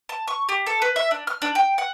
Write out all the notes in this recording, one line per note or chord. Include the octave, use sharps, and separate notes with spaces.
A5
C#6
G4
A4
B4
E5
D4
F6
D4
G5
F#5